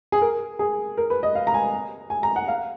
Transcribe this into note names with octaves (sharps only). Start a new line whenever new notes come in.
G#4
A#4
G#4
A#4
B4
D#5
F5
A#5
G#5
G#5
A#5
F#5
F5